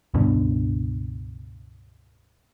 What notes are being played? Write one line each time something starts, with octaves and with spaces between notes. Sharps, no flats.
C#2 G2 B2 D3